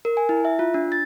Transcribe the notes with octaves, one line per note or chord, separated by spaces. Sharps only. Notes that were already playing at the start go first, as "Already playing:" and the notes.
A#4
G#5
E4
E5
F4
D4
A6